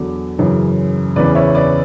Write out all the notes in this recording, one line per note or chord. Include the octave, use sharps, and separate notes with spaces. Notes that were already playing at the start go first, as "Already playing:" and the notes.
Already playing: E2 D3 F#3
F#2 C#3 E3
E2 C#3 E3 B4 D5
C#5 E5
B4 D5